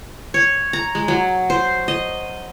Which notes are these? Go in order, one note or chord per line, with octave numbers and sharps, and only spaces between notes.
C#5
A#5
G#3
F#3
C5
D#5